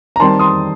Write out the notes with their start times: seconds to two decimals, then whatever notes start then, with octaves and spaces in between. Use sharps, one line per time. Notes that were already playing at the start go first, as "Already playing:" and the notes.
0.16 A#5
0.20 D#3 G3 C4 A5 C6
0.39 C6 D#6